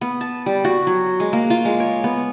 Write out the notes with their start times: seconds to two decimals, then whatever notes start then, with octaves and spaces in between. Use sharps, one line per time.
0.01 B3
0.21 A5
0.46 G3
0.65 F#4
0.87 F#3
1.20 G#3
1.33 A#3
1.50 F4
1.65 G#3
1.80 C#5
2.04 B3